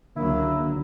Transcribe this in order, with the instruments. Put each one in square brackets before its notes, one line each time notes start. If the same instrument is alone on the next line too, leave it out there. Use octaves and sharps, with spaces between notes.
[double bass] C#2 F#3 [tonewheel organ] D3 [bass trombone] A#3 [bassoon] E4